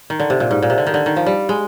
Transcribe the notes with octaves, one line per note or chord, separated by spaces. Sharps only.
D#3
D3
C3
A#2
G#2
A#2
C3
D3
D#3
D3
D#3
F3
G3
G#3